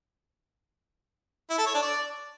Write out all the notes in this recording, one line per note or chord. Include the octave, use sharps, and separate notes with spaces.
E4
A4
C#5
D4
D5